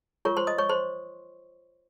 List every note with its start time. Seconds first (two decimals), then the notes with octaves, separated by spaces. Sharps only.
0.25 F4 A#4 C#5 C#6
0.37 C5 C6
0.47 D#5 D#6
0.58 C#5 C#6
0.69 C5 C6